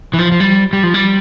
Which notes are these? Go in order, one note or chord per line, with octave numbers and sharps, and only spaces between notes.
E3
F3
F3
G3
G3
F3
G3